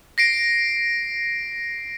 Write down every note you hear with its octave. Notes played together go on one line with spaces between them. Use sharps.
A#6 C7 D7